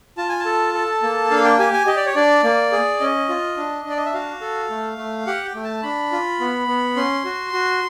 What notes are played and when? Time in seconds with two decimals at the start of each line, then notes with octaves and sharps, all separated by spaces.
0.17 F4 A5
0.29 G#5
0.40 A5
0.45 A4
0.74 A4
1.03 A#3
1.31 D4 F5
1.44 G5
1.59 G4 G#5
1.73 G#5
1.87 G4 D#5
1.97 D5
2.06 C#5
2.15 D4 D5
2.44 A#3
2.72 G#4
3.00 C#4 D#5
3.29 F4
3.57 D4
3.85 D4
3.90 D5
3.97 D#5
4.06 E5
4.14 F#4 F5
4.41 A4
4.70 A3
4.98 A3
5.27 G4 F#5
5.45 G5
5.55 A3
5.64 A5
5.83 D4 B5
6.12 F4
6.40 B3
6.68 B3
6.96 C#4 C6
7.25 F#4
7.53 F#4